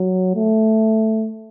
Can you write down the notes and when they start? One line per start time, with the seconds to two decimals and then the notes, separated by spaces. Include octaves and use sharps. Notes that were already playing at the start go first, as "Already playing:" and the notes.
Already playing: F#3
0.35 A3